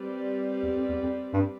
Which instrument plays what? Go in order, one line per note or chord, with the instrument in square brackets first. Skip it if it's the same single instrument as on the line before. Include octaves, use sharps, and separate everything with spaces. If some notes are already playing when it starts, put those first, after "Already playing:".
Already playing: [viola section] G3 C4 G4 B4 D5
[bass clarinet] E2
F2
E2
F2
G2